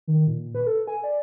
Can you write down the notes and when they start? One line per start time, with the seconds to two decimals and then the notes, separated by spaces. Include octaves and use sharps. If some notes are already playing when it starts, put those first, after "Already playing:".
0.07 D#3
0.27 A#2
0.55 B4
0.66 A4
0.88 G#5
1.04 D5